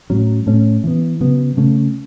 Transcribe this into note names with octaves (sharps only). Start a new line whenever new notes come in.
A2 F#3 C#4
A2 A3 C#4
E3 B3
C#3 F#3 B3
C#3 A3 C#4